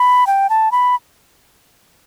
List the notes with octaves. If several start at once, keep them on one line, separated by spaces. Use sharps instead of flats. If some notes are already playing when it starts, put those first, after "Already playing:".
Already playing: B5
G5
A5
B5